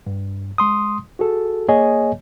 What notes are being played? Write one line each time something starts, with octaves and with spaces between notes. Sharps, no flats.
G2
G#3 C6 D#6
F#4 G#4 A4
A#3 G#4 C#5 D#5 G#5